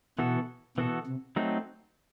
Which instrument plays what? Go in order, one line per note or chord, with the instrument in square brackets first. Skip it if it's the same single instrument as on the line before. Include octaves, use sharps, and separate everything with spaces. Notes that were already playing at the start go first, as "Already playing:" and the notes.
[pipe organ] B2 [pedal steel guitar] E3 B3 F#4 A4
[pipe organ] B2 [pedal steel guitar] E3 B3 F#4 A4
[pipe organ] C3
[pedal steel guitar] F#3 A3 C4 D#4